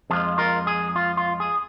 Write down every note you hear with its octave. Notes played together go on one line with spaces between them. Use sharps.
F2 F3 G#3 F4 G#4
F4 A#4
G#4
F4
F4
G#4